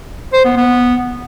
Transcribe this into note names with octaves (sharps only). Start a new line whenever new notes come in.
C5
B3
B3